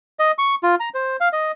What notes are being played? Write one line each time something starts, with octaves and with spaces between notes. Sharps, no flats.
D#5
C#6
F4
A#5
C5
F5
D#5